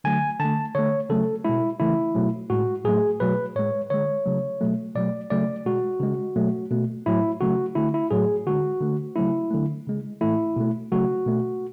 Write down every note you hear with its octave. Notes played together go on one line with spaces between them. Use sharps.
D3 F#3 A3 G#5
D3 A3 A5
D3 A3 C#5
C#3 F#3 A3 A4
B2 G#3 E4
C#3 E3 A3 E4
B2 F#3 A3
A2 G#3 F#4
A2 F#3 A3 G#4
B2 F#3 A3 B4
A2 G#3 C#5
D3 G#3 C#5
C#3 F#3 A3
B2 F#3 A3
B2 F#3 A3 D5
C#3 F#3 A3 D5
B2 G#3 F#4
C#3 G#3
B2 F#3 A3
B2 A3
A2 F#3 A3 E4
C#3 F#3 A3 F#4
D3 A3 E4
E4
A2 F#3 A3 G#4
D3 G#3 F#4
D3 A3
C#3 F#3 A3 E4
D3 F#3 A3
C#3 G#3
A2 E3 A3 E4
B2 A3
C#3 F#3 A3 F#4
B2 A3